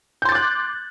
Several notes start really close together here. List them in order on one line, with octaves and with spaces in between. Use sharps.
G6 C6 A6 D6 F#6